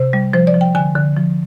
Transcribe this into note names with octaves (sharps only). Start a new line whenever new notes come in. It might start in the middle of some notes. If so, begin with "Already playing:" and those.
Already playing: C3 C5
G3
F3 C5
D5
F3
G5
D3 G#5
D3
F3